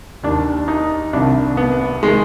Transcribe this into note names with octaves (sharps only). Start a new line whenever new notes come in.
D#2 D#3 D4
D#4
C2 C3 D#3 D4
B3
D#3 G#3